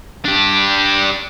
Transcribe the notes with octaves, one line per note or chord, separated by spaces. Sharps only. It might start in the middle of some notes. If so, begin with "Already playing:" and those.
D4 G4